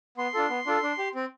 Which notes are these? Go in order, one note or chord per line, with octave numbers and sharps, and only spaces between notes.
B3 C6
D4 F4 A4
B3
D4 F4 A4
D4
G4
C4